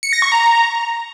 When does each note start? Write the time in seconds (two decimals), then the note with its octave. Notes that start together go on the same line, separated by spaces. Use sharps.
0.03 C#7
0.13 A#6
0.22 C#6
0.32 A#5